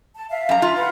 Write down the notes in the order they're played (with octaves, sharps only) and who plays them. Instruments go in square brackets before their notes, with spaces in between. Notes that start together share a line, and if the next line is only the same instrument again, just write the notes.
[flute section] A5
E5 F5
[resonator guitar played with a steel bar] F#2 A#5
[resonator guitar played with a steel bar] F4 [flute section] E5
[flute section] B4 F#5